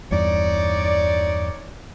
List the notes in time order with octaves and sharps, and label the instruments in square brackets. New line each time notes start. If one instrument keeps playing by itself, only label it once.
[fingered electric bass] E2 G2 [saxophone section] D#4 C#5 D5